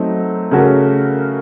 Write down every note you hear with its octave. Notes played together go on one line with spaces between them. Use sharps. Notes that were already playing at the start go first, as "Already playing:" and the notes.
Already playing: F#3 A3 C4 D#4
C#3 A3 C#4 F#4 A#4